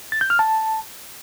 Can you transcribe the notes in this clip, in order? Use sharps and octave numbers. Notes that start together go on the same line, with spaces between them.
A6
G6
F6
A5